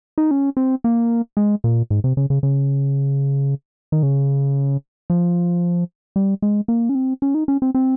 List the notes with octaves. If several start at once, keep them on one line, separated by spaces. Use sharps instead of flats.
D#4
C#4
C4
A#3
G#3
A#2
G#2
C3
C#3
C#3
C#3
D#3
C#3
F3
G3
G#3
A#3
C#4
C4
C#4
D#4
C#4
C4
C4